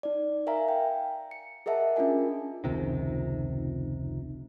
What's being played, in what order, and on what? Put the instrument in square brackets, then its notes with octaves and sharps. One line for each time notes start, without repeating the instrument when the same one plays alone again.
[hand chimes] D#4 D5
A#4 E5 F5 G#5 A#5
G5
C#7
G#4 A#4 D#5 E5 F#5 A5
C#4 D4 F4 A#4 G#5
[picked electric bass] F1 C#2 C3 D#3